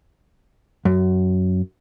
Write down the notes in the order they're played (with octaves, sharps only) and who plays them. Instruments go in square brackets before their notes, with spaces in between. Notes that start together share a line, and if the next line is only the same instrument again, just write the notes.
[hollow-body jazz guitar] F#2